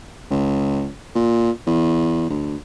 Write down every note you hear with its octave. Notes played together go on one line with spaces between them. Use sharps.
C#2
A#2
E2
D2